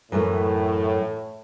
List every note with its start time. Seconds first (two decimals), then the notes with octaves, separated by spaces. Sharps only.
0.12 F#2 A2 E3 A3